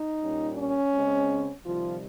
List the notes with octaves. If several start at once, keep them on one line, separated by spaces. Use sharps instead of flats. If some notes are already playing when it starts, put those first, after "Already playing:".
Already playing: D#4
A#2 G3 C#4
C#4
C#3 G#3 C4
C3 D#3 F3 G3 F4